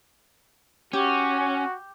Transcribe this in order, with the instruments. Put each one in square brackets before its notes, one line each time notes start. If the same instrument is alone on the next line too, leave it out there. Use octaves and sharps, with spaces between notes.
[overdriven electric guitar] C#4 [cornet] F#4 [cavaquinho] G4